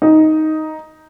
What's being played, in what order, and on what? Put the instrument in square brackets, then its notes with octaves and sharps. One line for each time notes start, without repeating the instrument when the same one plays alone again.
[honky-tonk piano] D#4